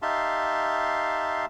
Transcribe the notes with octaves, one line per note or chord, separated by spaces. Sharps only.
D#4 G4 E5 F5 A5 C6